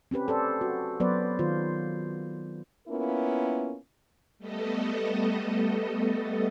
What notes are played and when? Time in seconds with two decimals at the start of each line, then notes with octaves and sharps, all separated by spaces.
0.11 C4 C#4 G4 B4
0.28 A4 C5 D5
0.61 F#4
1.00 F#3 B3 B4 C5 D5
1.39 D#3 F4 C5
2.88 A#3 B3 C#4 E4 F4 A#4
4.39 G3 A3 B3 A4 D#5